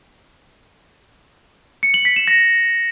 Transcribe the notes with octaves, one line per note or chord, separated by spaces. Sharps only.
C#7
F#7
B6
E7
A#6